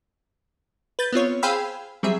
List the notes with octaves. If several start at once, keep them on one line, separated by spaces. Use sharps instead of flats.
B4 G6 A6
B3 C4 F4 C#5
G#4 C5 F5 G5 B5 E6
F#3 G3 C4 G#4 E5